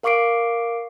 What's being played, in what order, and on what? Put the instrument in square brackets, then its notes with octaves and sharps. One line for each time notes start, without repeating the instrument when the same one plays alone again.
[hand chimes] A#4 F5 C#6 D6 C7 D7